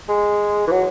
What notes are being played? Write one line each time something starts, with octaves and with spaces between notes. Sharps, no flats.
G#3
E3
F#3